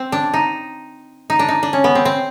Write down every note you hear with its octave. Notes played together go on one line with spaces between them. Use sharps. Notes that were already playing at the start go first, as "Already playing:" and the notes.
Already playing: C4
D4
D#4
D#4
D4
D#4
D4
C#4
B3
C4
C4